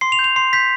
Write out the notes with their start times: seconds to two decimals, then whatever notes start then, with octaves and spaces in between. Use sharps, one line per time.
0.01 C6 C7
0.12 F7
0.19 G6
0.24 F7
0.36 C6 C7
0.53 G6 B6